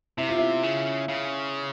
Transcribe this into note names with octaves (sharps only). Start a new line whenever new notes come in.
C3 E4
F4
E4
C#3
C#3